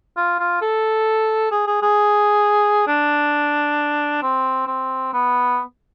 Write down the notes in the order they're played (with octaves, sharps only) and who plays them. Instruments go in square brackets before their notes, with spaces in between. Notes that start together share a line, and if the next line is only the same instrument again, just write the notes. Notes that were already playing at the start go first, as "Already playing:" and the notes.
[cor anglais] F4
F4
A4
G#4
G#4
G#4
D4
C4
C4
B3